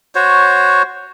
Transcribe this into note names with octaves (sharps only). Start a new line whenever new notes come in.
F#4 C5 C#5